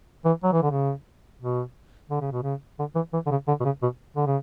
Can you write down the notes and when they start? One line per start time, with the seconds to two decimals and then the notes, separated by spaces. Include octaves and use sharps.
0.25 E3
0.43 F#3
0.52 E3
0.63 D3
0.71 C#3
1.41 B2
2.10 D3
2.21 C#3
2.32 B2
2.43 C#3
2.79 D3
2.95 E3
3.13 E3
3.26 D3
3.31 C#3
3.47 D3
3.60 B2
3.65 C#3
3.82 B2
4.16 D3
4.26 C#3